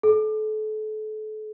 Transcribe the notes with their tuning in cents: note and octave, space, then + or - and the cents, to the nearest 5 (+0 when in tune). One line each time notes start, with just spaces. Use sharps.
A4 -35